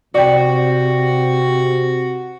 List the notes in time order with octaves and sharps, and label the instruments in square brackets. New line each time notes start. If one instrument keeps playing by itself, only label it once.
[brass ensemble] C3 [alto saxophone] F#4 [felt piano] D5 G5